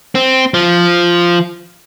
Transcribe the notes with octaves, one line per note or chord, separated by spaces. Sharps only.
C4
F3